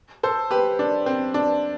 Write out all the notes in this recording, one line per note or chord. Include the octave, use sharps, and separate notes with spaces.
A4 C5
G4 B4
D4
C4
D4